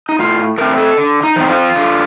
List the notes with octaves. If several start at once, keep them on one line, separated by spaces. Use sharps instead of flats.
D#4
A2 F4
A3 C4 A#4
A4
D3
D#4
F3 C4
F4
D3